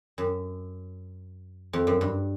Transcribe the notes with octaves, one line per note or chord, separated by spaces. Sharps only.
F#2
F2
F#2
G2